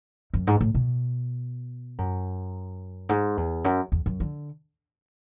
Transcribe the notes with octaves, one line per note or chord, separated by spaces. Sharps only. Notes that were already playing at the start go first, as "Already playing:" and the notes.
F#2
G#2
A2
B2
F#2
G#2
E2
F#2
E2
F#2
D3